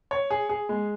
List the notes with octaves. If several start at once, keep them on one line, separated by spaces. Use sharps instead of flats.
C#5
G#4
G#4
G#3